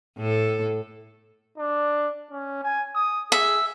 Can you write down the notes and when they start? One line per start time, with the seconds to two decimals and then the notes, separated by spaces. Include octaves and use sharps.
0.18 A2 A4
1.58 D4
2.31 C#4
2.63 G#5
2.95 D#6
3.32 G#4 E5